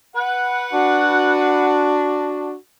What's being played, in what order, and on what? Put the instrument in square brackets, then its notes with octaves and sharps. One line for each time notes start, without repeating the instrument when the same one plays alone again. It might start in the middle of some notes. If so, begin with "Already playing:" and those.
[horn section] B4 F#5
[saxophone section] D4 F#4